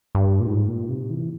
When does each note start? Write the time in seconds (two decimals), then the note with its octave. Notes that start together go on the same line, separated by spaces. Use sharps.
0.15 G2
0.40 A#2
0.47 G#2
0.68 A#2
0.89 C3
1.10 E3